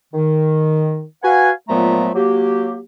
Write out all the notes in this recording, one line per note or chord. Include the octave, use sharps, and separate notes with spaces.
D#3
F#4 B4 F5 F#5 G#5
A#2 F3 F#3 A3 B3 A#5
F#3 A#3 G4